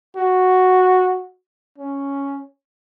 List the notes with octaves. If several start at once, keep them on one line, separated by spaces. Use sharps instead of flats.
F#4
C#4